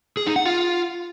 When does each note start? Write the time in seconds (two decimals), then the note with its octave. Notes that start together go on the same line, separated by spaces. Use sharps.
0.17 G#4
0.27 D#4
0.36 F#5
0.46 F4